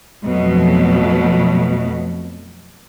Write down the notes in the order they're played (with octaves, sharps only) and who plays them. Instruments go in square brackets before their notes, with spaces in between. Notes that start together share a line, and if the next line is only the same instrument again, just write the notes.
[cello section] F2 B2 F#3 A3